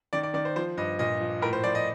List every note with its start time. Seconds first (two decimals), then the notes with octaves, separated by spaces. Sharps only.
0.13 D#3 D5
0.23 D5
0.34 D#3 D5
0.45 C5
0.56 F3 C5
0.77 G2 D#5
0.99 A#2 D#5
1.20 F3
1.42 A2 A#4
1.53 C5
1.64 F3 D5
1.75 D#5